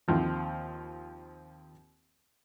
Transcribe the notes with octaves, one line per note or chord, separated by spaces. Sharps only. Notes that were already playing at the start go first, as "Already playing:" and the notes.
D#2 F3 C4